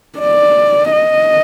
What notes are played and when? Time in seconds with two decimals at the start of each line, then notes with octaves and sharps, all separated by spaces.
0.19 D5
0.92 D#5